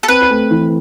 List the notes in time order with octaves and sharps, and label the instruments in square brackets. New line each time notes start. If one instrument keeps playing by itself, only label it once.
[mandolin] A4
[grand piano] C4 [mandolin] B4
[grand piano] A3
E3